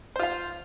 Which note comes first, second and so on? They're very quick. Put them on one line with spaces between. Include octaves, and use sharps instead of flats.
C5 F4 F5